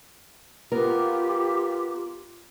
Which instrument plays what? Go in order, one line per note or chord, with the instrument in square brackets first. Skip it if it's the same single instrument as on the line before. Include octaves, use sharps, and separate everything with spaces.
[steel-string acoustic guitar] B3 A#4 [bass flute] F4 [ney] G4